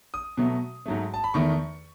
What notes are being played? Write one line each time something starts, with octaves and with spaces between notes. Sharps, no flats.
D#6
B2 F#3 A3
G#2 F#3 A3
A5
B5
E2 D#3 A3 C#6